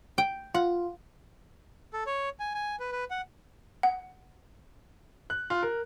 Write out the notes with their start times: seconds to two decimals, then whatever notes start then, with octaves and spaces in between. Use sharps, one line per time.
0.18 G5
0.54 F4 F#5
1.93 A4
2.06 C#5
2.40 G#5
2.55 G#5
2.80 B4
2.92 B4
3.11 F#5
3.83 F#5
5.30 F#6
5.50 F4
5.63 A#4